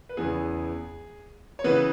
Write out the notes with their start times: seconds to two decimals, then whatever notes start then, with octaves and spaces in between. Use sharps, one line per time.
0.09 B4
0.17 E2 C#3 E3 B3 G#4
1.59 C#5
1.64 C#3 E3 B3 B4